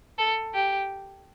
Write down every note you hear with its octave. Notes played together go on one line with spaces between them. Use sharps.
A4
G4